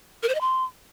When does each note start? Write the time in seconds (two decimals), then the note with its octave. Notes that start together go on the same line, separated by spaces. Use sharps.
0.23 A#4
0.29 C5
0.35 D#5
0.41 C6